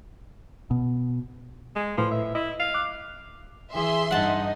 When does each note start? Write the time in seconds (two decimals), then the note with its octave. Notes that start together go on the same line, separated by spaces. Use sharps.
0.71 B2
1.76 G#3
1.98 A2 F3 B4
2.11 E5
2.35 E4 D#5
2.60 F5
2.74 D6 F#6
3.74 E3 G#4 E5 C6
4.11 G2 D#4 F#5 A5